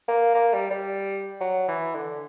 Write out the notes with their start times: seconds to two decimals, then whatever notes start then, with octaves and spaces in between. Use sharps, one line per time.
0.08 A#3
0.35 A#3
0.53 G3
0.71 G3
1.41 F#3
1.68 E3
1.95 D3